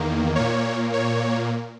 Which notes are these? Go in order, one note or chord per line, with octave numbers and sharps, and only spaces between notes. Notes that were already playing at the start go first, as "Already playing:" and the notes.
Already playing: E2 D#3 A#3
A#2 A#3 C#5
C#5